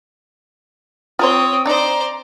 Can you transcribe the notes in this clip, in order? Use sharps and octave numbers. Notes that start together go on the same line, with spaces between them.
C4 F4 A#4 C5 C#5 D#6
D4 D#4 C5 D5 A#5